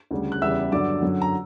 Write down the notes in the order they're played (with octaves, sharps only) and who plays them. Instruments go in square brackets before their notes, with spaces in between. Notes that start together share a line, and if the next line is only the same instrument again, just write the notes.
[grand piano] D2 C#3 G3
F#6
E2 C#3 G3 E5 E6
G2 D3 F#3 D5 D6
F#2 D3 F#3
A#5